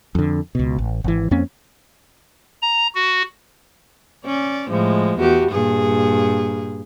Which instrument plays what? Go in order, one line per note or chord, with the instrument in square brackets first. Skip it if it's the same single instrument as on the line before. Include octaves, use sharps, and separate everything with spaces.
[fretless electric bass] F2 D3
C#2 B2
A1
G#1 E3
F2 A#3 C4 C#4
[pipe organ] A#5
F#4
[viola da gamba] C#4 D5
A2 F3 G#3
E2 F#4 G4
G2 A#2 G#4